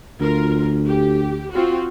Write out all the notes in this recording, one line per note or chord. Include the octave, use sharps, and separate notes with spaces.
D2 F4 A#4
G4
C4 F4 F#4